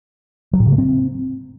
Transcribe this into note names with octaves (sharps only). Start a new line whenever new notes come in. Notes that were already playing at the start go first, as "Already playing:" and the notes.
F#3
A2
C#3
A3
C4